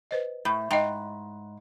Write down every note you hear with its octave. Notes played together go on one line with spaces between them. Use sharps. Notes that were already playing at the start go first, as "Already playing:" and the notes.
B4 C5 D#5
A2
G#2 D#5 G5